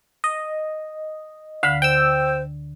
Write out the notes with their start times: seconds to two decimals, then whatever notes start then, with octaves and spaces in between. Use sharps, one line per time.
0.24 D#5
1.63 D2 D3 F5 B5
1.82 C5 G5 E6